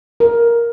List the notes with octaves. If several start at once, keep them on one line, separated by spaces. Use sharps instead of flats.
A#4